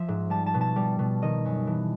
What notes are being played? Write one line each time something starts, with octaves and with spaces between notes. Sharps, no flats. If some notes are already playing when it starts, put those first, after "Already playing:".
Already playing: F3 E5
G#2
G3 A5
A5
B2
A5
G3
B2
D#3 D#5
F#2
E3